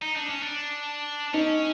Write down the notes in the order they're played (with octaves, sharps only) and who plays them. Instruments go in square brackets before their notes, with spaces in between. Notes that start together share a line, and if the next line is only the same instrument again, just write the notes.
[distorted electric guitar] D#4
D4
C#4
D4
[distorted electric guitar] C#4 [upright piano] D#4